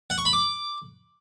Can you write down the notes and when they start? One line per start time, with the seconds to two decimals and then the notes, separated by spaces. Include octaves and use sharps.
0.10 F#5
0.18 C#6
0.25 B5
0.33 D6